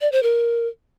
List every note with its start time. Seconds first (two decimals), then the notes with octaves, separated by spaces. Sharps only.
0.01 D5
0.12 C5
0.23 A#4